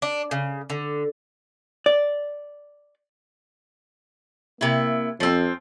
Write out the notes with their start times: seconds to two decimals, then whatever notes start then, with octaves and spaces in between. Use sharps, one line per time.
0.02 D4
0.31 C#3
0.70 D3
1.86 D5
4.61 C3 A#3 E4
5.20 F2 F3 C4